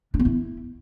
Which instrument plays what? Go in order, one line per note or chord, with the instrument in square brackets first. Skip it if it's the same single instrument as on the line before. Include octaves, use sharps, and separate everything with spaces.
[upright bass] D4
B3
E4